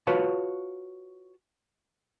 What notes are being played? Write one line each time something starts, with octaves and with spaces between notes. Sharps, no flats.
F4 F#4 B4 C#5 F5 A5